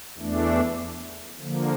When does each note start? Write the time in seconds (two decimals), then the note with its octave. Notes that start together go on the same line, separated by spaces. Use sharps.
0.18 E2 E3 A3 D4
1.40 D3 F3 A#3